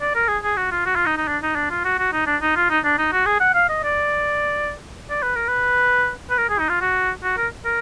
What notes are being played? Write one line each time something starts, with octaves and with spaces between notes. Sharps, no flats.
D5
A#4
G#4
G#4
F#4
F4
F#4
F4
D#4
D#4
D4
D#4
D4
F4
F#4
F#4
D#4
D4
D#4
F4
D#4
D4
D#4
F#4
G#4
F#5
F5
D#5
D5
D5
B4
A#4
B4
B4
A#4
G#4
D#4
F4
F#4
F#4
A#4
A#4